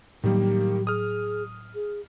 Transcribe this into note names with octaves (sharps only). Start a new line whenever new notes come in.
A2 D#3 F#3 G3 A#3 G4
G#4 D#6 F6
G#4